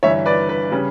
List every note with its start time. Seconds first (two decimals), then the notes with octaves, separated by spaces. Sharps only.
0.03 G1 G2 E3 C#5 E5
0.26 B4 D5
0.49 B4
0.72 C#3 G3 C#4